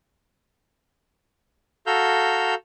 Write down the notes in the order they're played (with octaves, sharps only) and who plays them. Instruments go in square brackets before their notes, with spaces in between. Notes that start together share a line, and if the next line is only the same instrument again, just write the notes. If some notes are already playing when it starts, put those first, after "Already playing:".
[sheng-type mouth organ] F#4 A4 F5 A#5 E6 G6